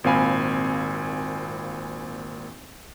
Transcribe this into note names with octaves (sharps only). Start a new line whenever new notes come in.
G#1 A#2 C4 F5 G#5 B5